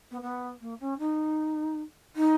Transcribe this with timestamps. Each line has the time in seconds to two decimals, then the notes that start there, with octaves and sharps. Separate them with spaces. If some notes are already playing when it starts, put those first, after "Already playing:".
0.11 B3
0.21 B3
0.60 A#3
0.80 C#4
0.98 D#4
2.16 D#4